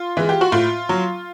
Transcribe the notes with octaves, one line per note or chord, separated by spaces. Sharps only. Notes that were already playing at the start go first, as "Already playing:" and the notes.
Already playing: F4
E3 G#3
G4
F#4
A2 F4
F#3